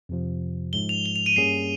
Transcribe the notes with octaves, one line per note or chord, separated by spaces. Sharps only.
F2 C3 F3
G#2 F3 G#3 G7
F7
G7
F7
D#7
G2 G3 A#3 C#4 G#4 C7